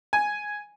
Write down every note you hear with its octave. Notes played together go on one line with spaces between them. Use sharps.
G#5